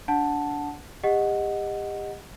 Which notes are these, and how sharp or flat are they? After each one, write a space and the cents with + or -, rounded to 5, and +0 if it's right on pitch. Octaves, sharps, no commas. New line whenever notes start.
D4 -20 F#5 -5 A5 +0
G4 +40 D#5 -5 F#5 +0